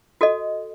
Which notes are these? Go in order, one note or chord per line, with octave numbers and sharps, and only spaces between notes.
F#4 A4 D#5